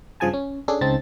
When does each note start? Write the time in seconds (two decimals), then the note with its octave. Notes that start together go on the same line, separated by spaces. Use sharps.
0.20 G2 C#3 F3 G#4 G#5 A5
0.33 C#4
0.68 C#4 D4 G#4 A4
0.81 C#2 C#3 C4 D#4 A5 A6